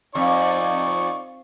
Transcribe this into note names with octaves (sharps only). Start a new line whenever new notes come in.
F2 D#4 D5 C#6